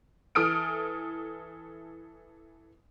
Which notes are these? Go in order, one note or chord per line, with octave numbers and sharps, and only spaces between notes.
E3 A4 D#6 F6 D7